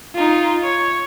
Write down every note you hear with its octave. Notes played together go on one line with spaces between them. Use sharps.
D#4 F4
C#5